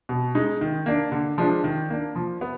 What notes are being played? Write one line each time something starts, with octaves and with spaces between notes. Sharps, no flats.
B2
G#3 D#4
D#3
A#3 D4
D3
F3 G#3 D4
D#3
A#3 D4
F3
B3